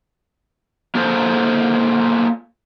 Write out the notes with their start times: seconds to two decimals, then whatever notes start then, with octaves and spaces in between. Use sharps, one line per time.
0.95 A#3 F4 G#4 A4 C5